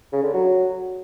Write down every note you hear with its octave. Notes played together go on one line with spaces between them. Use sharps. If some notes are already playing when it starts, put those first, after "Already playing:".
C#3
D3
F#3